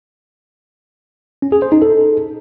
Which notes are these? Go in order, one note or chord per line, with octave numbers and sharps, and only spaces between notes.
C#4
G#4
C5
D#4
A4